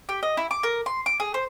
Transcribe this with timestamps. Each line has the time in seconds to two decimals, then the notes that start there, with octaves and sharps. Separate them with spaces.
0.09 G4
0.23 D#5
0.37 E4
0.51 D6
0.63 A#4
0.86 C6
1.06 D6
1.20 G#4
1.34 C5